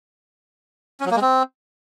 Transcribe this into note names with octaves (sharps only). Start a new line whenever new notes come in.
C#4
F#3
A#3
G#3
C4